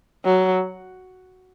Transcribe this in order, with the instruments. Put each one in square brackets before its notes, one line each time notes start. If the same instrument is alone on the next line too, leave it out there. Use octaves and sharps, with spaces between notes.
[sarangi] F#3